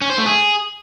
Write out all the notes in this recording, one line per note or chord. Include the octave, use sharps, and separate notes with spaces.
C#4
C5
A3
G#4